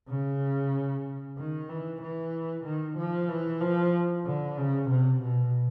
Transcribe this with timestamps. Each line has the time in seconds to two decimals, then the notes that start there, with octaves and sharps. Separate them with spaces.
0.09 C#3
1.38 D#3
1.70 E3
2.02 E3
2.65 D#3
2.98 F3
3.29 E3
3.61 F3
4.26 D3
4.57 C#3
4.90 C3
5.22 B2